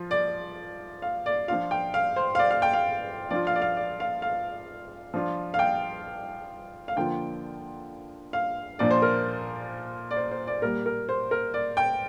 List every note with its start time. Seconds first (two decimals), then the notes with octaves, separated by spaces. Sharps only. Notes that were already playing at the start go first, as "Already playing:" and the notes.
Already playing: F3 F4
0.11 D5
1.02 F5
1.26 D5
1.48 F3 D4 F4 F5
1.71 G5
1.94 F5
2.16 C5
2.35 F5
2.39 D5
2.51 F5
2.62 G5
2.73 F5
3.30 F3 D4 F4 D5
3.47 F5
3.55 D5
3.62 F5
3.77 D5
4.00 F5
4.22 F5
5.14 F3 D4 F4
5.54 F5
5.59 G5
6.88 F5
6.96 D3 F3 A#3 F4 G5
8.33 F5
8.79 A#2 F3 D4 D5
8.91 C5
9.02 A#4
10.11 D5
10.17 C5
10.31 C5
10.47 D5
10.62 A#2 G3 A#3 A#4
10.86 A#4
11.09 C5
11.31 A#4
11.54 D5
11.77 G5